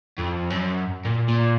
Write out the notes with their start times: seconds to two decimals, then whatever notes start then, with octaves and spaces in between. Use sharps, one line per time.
0.18 F2
0.50 F#2
1.05 A#2
1.28 A#2